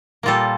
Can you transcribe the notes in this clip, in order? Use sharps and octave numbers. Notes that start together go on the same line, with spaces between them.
A#2 G3 A#3 F4 A4